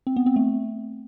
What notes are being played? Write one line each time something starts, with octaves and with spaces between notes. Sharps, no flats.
C4
B3
C4
A3